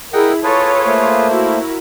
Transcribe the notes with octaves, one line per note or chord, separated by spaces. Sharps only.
E4 G#4 A#4 D#5 F#5 G5
F4 G#4 A4 B4 C#5 A5
A3 A#3 C5
E4 F#4 A#4